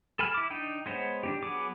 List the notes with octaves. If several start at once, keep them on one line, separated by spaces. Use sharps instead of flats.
A4 G#5 B5 F6
E4 D6
D4 D#4 G5
G#3 B3 C5 C#5
D4 D#4 G4
F#3 B3 G#4 D6